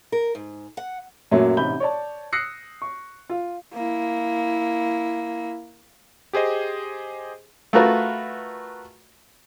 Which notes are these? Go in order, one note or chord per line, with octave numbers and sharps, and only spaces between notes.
A#4
G#2
F#5
F#2 A#2 F#3 A3 A#3
A1 C3 D#4 B5 G6 G7
C#5 D5 A5
D#6 E6 F#6 A#6 C7 C#7
C#6
F4
A#3 E4
G4 G#4 C5 D#5
A3 F4 F#4 A#4 B4